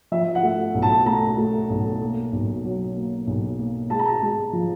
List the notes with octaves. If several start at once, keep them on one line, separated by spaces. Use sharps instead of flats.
F3 E5
F#5
A3
B1
A5
A3 A#5
A3
B1
A#3
B1
F#3
A#3
B1
A#3
G#3 A5
A#5
A5
G#3
F3